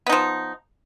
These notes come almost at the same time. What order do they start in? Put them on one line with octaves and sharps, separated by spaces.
B3 D#4 F3